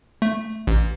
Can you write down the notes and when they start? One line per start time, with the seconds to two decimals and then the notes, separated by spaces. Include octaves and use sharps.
0.22 A3
0.67 A1